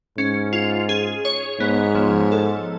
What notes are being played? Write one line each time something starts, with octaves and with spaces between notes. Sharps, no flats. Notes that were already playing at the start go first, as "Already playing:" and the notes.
G#2 C#4
F4
G#4
C#5
G#2 B3
F3
A4